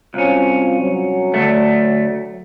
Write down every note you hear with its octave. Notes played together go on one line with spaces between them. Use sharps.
C2 F#3 C4 C#4 F4
F#3
D2 A3